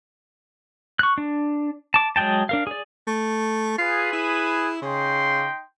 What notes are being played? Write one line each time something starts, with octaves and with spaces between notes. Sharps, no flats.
C#6 F#6
D4
A5 D6
F#3 G#3 G#4 G5 A5
D4 A#4 F5
G#4 D5
A3
F4 G#4 B4
E4
C#3 D#4 G5 C6